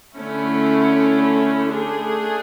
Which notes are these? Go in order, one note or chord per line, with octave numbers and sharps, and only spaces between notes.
D3 A3 C#4 E4
A3 D4 G#4